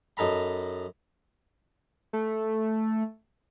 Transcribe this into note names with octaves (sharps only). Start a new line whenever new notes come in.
F#2 D#4 A4 A#5 B5
A3